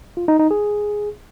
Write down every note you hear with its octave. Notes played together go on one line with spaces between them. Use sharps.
F4
D#4
D#4
G#4